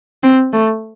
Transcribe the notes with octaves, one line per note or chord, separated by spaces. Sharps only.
C4
A3